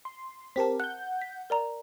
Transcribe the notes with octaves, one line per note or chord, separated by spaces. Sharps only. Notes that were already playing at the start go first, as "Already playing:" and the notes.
C6
C4 G4 A#4 A5 B6
F#5 F#6 G6
B6
A#4 D5 A#5